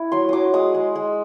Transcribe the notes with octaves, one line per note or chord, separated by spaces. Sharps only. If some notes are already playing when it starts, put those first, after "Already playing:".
Already playing: E4
F#3 C6
F#3 D6 D#6
G#3 D#6
G#3
G#3